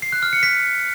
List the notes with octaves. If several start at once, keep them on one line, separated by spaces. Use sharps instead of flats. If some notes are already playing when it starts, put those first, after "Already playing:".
C7
F#6
F6
C#7
B6